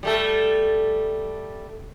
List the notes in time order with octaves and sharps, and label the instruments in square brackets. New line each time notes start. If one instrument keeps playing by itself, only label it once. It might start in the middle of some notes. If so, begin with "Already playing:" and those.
[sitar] G3 A3 A4